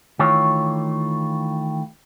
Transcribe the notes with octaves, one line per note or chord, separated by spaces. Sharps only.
D#3 E3 A3 F4 C#5